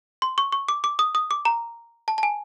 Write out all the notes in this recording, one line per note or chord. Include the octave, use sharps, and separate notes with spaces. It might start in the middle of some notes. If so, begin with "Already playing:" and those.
C6
C#6
C#6
D6
D6
D#6
D#6
D6
A#5
A5
A5
G#5